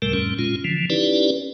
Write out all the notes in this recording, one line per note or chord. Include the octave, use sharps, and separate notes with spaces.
C#2 A2 C3 G3 A3 A#4
F2 A2 G3 C#4
A#2 G#3 C#4 F4
D3 E3 F3
C#4 D#4 E4 G4 B4 D5